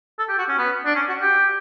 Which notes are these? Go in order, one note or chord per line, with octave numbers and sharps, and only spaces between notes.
A4
G4
F#4
C#4
B3
D4
C#4
F#4
G4